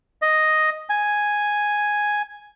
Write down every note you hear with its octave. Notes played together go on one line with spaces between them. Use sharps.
D#5
G#5